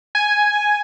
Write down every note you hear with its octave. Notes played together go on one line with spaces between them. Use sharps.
G#5